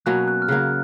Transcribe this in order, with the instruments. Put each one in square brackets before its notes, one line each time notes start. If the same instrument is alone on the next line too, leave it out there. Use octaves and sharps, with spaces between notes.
[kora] B2 F#3 A#3 C#4 [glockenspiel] F#6
[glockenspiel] F#6
F6
[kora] C#3 F#3 A#3 [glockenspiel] F#6